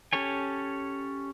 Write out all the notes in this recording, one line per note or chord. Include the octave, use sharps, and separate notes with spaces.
C#4 G4 A4 C#5 G#5